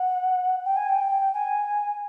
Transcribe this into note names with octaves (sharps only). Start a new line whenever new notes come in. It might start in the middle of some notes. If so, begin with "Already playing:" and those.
Already playing: F#5
G5
G#5
G5
G#5